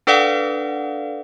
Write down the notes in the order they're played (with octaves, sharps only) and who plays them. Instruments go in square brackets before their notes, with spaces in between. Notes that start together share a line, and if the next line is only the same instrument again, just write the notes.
[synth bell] D4 A4 B4 D5 F5 F#5